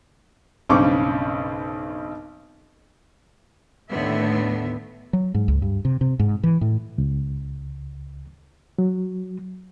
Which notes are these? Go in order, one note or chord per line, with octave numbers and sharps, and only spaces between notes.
B1 G2 C#3 C4 C#6 D6
D#2 A2 D3 B3 E5
F#3
G#2
C#2
G2
C3
C3
G#2
E3
A2
C#2
F#3